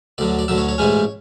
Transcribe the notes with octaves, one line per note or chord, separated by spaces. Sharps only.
D2 D3 F#3 D5
D5
D2 D3 F#3 E5
C#5
C#5
A1 G#2 E3 G#3 C#4